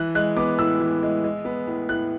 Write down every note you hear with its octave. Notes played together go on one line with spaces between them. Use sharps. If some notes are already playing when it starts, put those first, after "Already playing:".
Already playing: E3 F#6
G#3 F#6
B3 D6
A2 E6
E3
G#3
G#3
B3
A2
A2 F#6